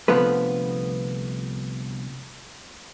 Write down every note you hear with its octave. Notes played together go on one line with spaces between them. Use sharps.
C2 D3 F3 A3 B3 B4